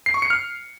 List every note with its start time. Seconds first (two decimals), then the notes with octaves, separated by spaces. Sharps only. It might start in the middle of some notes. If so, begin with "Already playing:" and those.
0.06 C7
0.14 C#6
0.22 C#7
0.30 F6